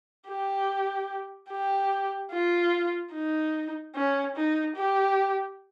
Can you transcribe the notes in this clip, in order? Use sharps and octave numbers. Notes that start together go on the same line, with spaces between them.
G4
G4
F4
D#4
C#4
D#4
G4